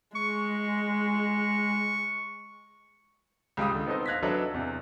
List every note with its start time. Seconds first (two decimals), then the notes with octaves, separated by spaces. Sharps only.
0.16 G#3 C#6
3.57 C#2 G3 F5 D#6
3.71 C#2 D3
3.87 B3 C4 D#4 A4 C5 D#5
4.06 F5 F#6 G#6 A#6 B6
4.23 F#3 D4 A4 B4 D#5 E5
4.53 E2 C3